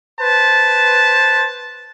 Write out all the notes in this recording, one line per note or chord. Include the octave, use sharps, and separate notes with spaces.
B4 C5 A5